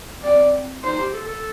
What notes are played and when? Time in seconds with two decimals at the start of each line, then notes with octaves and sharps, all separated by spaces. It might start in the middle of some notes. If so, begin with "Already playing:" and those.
0.23 C4 D5
0.83 D#4 C5
0.98 G4
1.13 A4
1.28 A4